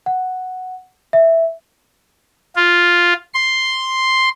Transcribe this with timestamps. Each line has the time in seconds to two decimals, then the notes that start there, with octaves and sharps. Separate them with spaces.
0.06 F#5
1.13 E5
2.56 F4
3.34 C6